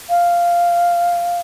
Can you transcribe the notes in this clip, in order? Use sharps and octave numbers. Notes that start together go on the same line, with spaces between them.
F5